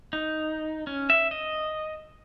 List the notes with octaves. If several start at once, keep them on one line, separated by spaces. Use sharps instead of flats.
D#4
C#4
E5
D#5